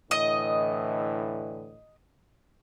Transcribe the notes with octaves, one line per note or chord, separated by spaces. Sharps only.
A2 D3 E3 D#5